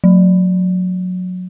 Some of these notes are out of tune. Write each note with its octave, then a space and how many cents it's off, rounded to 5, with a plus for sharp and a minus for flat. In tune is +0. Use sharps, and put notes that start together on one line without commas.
F#3 -25